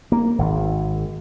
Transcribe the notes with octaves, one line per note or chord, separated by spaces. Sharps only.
A#3
G#1